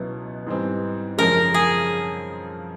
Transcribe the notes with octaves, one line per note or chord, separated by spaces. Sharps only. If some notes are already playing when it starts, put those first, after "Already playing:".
Already playing: C#2 B2 F#3 B3 E4
G#2 E3 G3 C4
F#2 C#3 F3 G#3 A#4
G#4